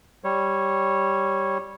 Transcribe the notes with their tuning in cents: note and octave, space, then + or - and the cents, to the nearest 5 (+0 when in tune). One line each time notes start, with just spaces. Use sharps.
G3 +0 C#5 -10